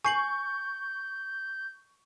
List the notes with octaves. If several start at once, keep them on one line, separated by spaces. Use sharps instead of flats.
G#5 C#6 G6 C7 F#7